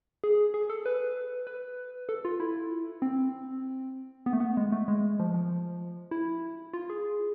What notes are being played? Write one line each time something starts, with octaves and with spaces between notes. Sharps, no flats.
G#4
G#4
A4
B4
B4
A4
F4
E4
C4
B3
A3
B3
G#3
A3
G#3
F3
F3
E4
F4
G#4